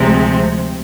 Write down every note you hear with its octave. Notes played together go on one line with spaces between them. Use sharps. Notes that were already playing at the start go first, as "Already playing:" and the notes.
Already playing: D2 C3 F3 G#3 C4